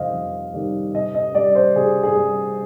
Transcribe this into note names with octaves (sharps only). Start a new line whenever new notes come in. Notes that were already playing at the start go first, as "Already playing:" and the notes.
Already playing: F2 C3 D#3 G3 C5 D#5 F5
F2
C3 D#3 G3
C3 D#5
D#5
G3 D5
C5
C3 G#4
G#4
G3